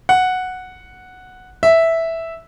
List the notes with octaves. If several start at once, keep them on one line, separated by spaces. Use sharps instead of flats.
F#5
E5